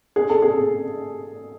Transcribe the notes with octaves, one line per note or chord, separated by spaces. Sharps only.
G#4
A4
G#4